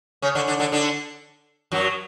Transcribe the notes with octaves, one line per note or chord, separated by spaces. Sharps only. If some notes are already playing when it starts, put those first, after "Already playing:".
C#3 C#4
D3 D4
D3 D4
D3 D4
D3 D4
F#2 F#3